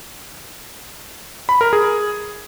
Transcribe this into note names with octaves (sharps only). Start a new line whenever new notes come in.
B5
A#4
G#4